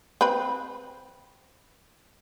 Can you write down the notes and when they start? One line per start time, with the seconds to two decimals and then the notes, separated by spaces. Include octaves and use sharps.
0.21 C4 B4